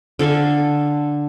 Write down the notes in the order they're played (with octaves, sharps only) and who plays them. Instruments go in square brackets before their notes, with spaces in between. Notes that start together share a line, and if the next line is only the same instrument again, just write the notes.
[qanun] D3 A4 F5 G#5